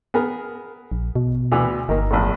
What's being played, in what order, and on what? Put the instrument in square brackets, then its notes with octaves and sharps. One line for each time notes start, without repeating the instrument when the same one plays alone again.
[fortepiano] B3 G#4 A#4
[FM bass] A#1
B2
[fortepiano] D2 E3 B3
[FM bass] G1 [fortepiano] D#3 A#3
[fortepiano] A#1 E2 A2